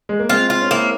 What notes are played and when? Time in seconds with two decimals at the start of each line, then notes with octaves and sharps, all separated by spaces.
0.09 G#3
0.19 A#3
0.29 G#3 C4 F4
0.50 F4
0.62 C#4
0.71 A#3 C4 E4